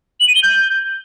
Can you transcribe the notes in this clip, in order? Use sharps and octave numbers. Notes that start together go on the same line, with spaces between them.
F#7
D#7
G7
G6